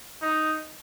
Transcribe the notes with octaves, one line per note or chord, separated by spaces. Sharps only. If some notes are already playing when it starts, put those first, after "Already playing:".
D#4